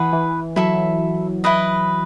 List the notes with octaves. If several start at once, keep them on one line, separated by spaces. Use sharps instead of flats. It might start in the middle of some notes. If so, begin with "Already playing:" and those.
Already playing: E3 E4 G#4 B4 F#5
E3
F#3 E4 A4 E5
E4 B4 D#5